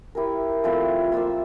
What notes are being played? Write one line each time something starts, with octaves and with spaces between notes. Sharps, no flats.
E4 G4 A#4
F3 A3 C4 E4
A#3 F4 C5 E5